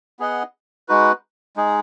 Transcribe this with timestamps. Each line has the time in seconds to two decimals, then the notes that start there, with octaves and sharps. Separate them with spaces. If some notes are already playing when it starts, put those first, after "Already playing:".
0.19 B3 G#4 D#5 F#5
0.88 G#3 D#4 F#4 B4
1.56 G#3 D#4 G#4